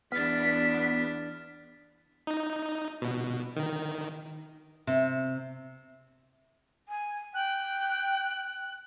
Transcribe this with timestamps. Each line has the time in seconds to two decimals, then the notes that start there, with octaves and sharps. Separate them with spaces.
0.12 E2 B3 D4 F6 A6 B6
2.27 D#4
3.02 B2
3.57 D#3
4.87 C3
6.89 G#5
7.34 G5 F#6